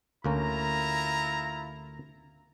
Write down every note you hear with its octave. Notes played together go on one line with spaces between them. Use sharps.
D2 A#3 C#4 E4 F4 A#5